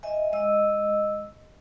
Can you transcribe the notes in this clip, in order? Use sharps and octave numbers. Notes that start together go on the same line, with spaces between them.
D#5 E5 G#5
G#3 D#5 E6